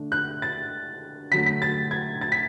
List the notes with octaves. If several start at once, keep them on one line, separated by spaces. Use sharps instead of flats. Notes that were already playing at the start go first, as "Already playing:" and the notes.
Already playing: D3 A3 D4
F#6
A6
D3 F#3 A3 B6
B6
A6
G#6
A6
B6